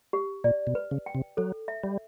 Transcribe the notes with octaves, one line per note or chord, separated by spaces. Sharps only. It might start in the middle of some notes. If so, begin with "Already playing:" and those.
G4
A#2 D5
B2
B4
C#3
G5
C3
F#3 A4
E5
G3